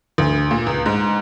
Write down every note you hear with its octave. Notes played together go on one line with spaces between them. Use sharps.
D2
A#2
C#2
G#2